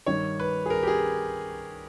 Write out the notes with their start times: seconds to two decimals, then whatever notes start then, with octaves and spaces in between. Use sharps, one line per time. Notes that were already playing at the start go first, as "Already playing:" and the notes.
0.06 G2 D#3 C#5
0.40 B4
0.66 G#4
0.70 A#4
0.83 G4
0.87 G#4